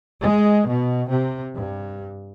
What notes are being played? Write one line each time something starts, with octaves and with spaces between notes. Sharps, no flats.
G#3
B2
C3
G2